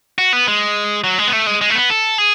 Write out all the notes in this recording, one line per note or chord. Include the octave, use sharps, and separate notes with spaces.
F#4
B3
G#3
F#3
G#3
B3
A3
G#3
G#3
A3
B3
A4
G#4